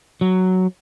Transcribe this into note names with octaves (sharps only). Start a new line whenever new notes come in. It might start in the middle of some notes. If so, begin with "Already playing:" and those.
F#3